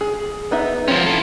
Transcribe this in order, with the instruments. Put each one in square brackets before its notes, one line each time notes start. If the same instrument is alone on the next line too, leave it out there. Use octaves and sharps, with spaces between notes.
[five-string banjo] G#4
B3 D#4 E5
[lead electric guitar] F3 C#4 [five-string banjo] C4
[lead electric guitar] E4 A4